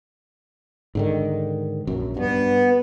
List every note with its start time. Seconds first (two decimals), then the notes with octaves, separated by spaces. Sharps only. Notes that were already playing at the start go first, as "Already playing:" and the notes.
0.95 G#2 D3 D#3
1.87 A#1 F#2
2.17 G2 B3